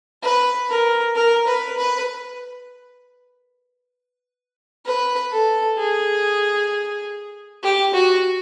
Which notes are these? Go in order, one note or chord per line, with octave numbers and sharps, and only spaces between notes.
B4
A#4
A#4
B4
B4
B4
A4
G#4
G4
F#4